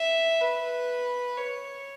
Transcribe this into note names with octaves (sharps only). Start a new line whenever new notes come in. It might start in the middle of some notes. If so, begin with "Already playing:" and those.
Already playing: E5
B4
C#5